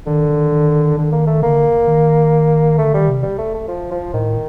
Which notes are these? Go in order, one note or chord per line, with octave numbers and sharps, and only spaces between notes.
D3 D#3
D#3
D#3
D3 D#3
A#3
A3
D3 A#3
D#3
D3 A3
D#3 G3
C3
G3
A3
A3
F3
F3
A2 D#3